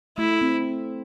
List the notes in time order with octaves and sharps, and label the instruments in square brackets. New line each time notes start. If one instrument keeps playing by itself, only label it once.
[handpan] A3 [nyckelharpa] E4
[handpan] C4